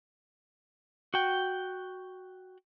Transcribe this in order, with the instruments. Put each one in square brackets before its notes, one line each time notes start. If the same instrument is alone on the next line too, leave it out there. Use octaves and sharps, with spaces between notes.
[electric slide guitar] F#4 G5